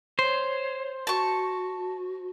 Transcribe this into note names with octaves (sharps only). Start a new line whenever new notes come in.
C5 C#5
F#4 A5 C#6